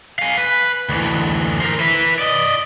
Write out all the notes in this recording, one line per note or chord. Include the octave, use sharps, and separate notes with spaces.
F5 G#5
B4
D2 E3
A#4 C5
E4 B4
D5 D#5